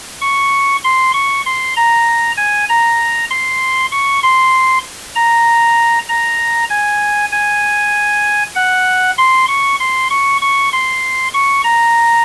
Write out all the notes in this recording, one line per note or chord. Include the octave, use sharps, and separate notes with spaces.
C#6
C6
C#6
C6
A#5
G#5
A#5
C6
C#6
C6
A#5
A#5
G#5
G#5
F#5
C6
C#6
C6
C#6
C#6
C6
C#6
A#5